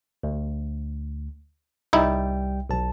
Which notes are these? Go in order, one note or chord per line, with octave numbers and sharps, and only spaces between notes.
D2
C2 G3 D#4 E4 G5
B1 A5